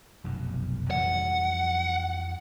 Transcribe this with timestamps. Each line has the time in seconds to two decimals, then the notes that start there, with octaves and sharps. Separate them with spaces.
0.24 F1 B1 F#2
0.91 F2 E3 G3 F#5